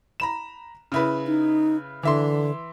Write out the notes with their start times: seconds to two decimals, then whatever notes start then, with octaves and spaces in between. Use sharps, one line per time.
0.20 A#5 B5 E7
0.92 C#3 E4 B4
1.27 D#4
2.03 D3 E3 E5 C6